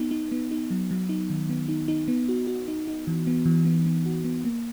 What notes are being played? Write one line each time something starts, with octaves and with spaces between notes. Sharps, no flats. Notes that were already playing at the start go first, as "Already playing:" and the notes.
Already playing: B3 D#4
D#4
B3
D#4
F#3
F#3
D#4
D#3
B3
D#4
D#4
B3
F#4
F#4
D#4
D#4
E3
B3
E3
B3
B3
F#4
B3
A#3